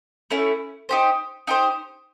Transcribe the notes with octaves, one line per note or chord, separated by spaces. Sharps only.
A3 C#4 E4
D#4 G4 C5
D#4 G4 C5